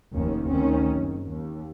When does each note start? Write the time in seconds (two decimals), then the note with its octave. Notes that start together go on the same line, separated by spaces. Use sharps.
0.12 F1 D#2 D#3 C#4
0.46 D2 D#3 C4 C#4
0.92 F#1
1.27 D#2